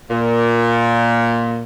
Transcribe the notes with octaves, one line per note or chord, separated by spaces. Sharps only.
A#2